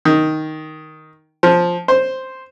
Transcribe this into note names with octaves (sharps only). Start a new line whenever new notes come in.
D#3
F3
C5